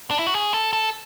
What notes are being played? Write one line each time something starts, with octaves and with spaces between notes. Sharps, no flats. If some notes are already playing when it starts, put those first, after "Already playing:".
D4
E4
F#4
G#4
A4
A4